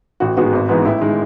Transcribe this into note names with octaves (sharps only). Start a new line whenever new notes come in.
A1 F#4
G#2 D#3 G#3 B3 F#4
G#1
G#2 E3 G#3 B3
A1 E4
D#3 G#3